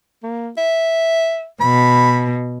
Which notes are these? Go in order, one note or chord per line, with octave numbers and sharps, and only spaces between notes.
A#3
E5
B2 B5